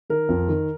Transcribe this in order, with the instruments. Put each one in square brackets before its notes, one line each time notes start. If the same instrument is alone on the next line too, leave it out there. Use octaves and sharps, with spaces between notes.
[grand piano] D#3 A#4
F2
D#3